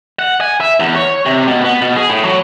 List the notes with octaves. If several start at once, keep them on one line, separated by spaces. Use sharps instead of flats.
F#5
G#5
E5
E2
C#5
C3
B2
B3
B2
G#4
A2
F#3